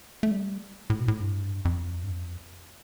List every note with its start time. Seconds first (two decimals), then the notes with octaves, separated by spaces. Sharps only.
0.23 A3
0.31 G3
0.90 A2
1.00 B2
1.08 A2
1.20 G2
1.65 F2
2.03 G2
2.10 F2